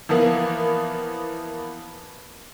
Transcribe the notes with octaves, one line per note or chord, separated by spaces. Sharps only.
E3 F3 A#3 B3